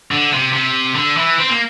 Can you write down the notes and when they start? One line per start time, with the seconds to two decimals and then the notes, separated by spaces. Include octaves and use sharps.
0.11 D3
0.33 C3
0.53 C3
0.96 D3
1.17 E3
1.40 C4
1.50 A#3